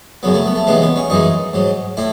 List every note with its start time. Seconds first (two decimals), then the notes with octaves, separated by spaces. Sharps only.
0.23 F#2 C#3 F#3 B3
0.34 A3
0.46 B3
0.55 A3
0.67 D#2 C#3 E3 G#3 B3
0.82 B3
0.96 C#4
1.10 F#2 E3 G#3 D#4
1.53 G#2 F#3
1.97 A2 E4